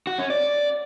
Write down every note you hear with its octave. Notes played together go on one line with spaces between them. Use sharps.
F#4
C#4
D5